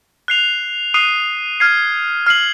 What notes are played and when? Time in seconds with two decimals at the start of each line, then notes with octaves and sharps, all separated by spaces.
0.28 F#6 C7 F7
0.94 D#6 F#6 C7 D#7
1.60 F6 G#6 C7
2.26 F6 C7 F#7